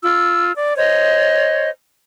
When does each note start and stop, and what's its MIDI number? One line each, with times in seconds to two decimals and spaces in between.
0.02 0.52 65
0.02 0.52 88
0.56 0.76 74
0.78 1.69 72
0.78 1.69 73
0.78 1.69 75